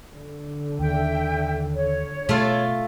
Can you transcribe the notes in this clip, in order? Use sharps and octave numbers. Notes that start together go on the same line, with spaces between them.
D3
D#2 E5 G5
C#5
B2 A3 F4